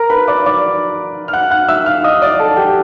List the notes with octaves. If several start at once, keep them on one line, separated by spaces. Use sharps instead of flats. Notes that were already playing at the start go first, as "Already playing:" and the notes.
Already playing: A#4 A#5
B4 B5
D5 D6
D5 D6
F6
F#5 F#6
F#5 F#6
E5 E6
F5 F6
D#5 D#6
D5 D6
A4 A5
G4 G5